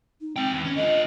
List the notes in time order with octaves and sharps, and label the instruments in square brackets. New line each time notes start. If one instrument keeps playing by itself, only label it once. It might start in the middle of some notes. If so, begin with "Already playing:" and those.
[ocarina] D#4
[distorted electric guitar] G#3 G5 [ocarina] C4
[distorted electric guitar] E2
C#4
[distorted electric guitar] D3 F4 [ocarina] D#5